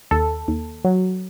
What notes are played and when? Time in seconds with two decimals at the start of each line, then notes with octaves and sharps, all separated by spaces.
0.11 D#2 A4
0.48 D#2
0.84 F#3